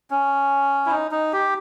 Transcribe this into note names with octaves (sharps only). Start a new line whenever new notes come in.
C#4
E4
D#4
D#4
G4